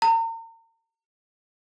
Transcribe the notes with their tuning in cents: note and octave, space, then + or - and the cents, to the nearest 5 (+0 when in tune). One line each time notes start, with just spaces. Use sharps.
A#5 -40